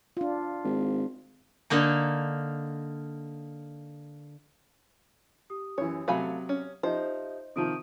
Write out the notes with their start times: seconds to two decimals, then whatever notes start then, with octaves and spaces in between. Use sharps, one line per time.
0.17 D4 F4
0.64 G#1
1.70 D3 A#3 D#4
5.50 G4 D#6
5.78 F#2 E3 C#5
6.08 C3 F#3 A3 F5 G#5 B5
6.49 C#4
6.83 F3 D#4 G4 C5 D#5 E5
7.56 C3 D#3 F3 D#6 D7 D#7